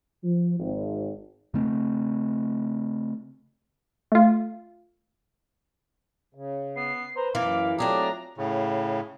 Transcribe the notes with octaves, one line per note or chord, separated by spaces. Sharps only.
F3
G#1
C#3 A3 C4
A3 F4
C#3
B3 C7
B4 C5 A#5
F#2 E3 A#3 F5 D6
F#3 A3 C4 D4 F4 G4 G#4 A#5
A2 C#3